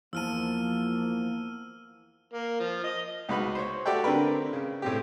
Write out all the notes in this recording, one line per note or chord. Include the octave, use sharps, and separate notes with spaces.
E2 F3 A#3 A5 E6 F6 D#7
A#3
F3
D#5
C#2 D#4 F#4 B4 B5
C5 C#5
F#4 G4 A4 D5 E5 G5
D3 C4 D4 A#4 B4
C#3
A2 C4 G4